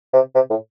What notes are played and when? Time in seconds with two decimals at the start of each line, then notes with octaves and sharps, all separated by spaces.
0.13 C3
0.35 C3
0.50 A2